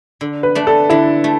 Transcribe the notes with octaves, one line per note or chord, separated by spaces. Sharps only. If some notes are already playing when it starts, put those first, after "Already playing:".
D3
B4
A3 D4
A4
D3 E4
A3